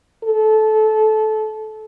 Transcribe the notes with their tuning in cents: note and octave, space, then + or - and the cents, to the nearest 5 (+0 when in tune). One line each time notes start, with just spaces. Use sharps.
A4 -20